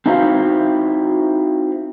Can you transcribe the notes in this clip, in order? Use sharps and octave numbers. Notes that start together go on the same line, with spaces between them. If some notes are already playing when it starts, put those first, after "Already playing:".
C4 D#4 E4 F#4 C5 F5